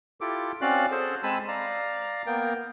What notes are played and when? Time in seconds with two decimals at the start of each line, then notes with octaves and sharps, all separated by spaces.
0.21 E4 F4 G4 A4 D6
0.61 C4 C#4 F#4 D5 F5 F#6
0.91 G#4 A4 C5
1.23 G#3 C4 G#5 A5 B5 E6
1.48 D5 F5 A#5
2.27 A#3 B3 A#4 G5